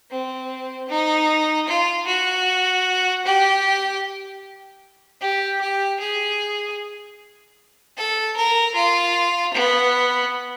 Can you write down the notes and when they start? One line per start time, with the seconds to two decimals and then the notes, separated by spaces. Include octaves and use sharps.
0.10 C4
0.88 D#4
1.68 F4
2.07 F#4
3.25 G4
5.21 G4
5.60 G4
6.00 G#4
7.97 A4
8.36 A#4
8.75 F4
9.53 B3